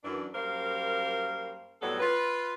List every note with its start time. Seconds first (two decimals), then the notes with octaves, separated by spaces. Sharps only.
0.04 F#2 E3 D4
0.35 F#2 G3 A#3 A#4 C5 F5
1.82 F2 A2 F#3 G3 B3 A4
2.00 F4 B4